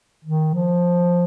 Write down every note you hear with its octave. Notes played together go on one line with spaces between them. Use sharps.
D#3
F3